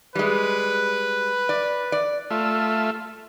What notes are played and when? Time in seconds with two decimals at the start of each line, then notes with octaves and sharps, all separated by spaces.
0.15 G3 G#3 B4
1.49 D5
1.92 D5
2.30 A3 F4 E5